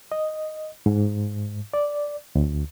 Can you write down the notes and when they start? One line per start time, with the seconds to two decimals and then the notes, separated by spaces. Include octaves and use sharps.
0.12 D#5
0.86 G#2
1.74 D5
2.35 D2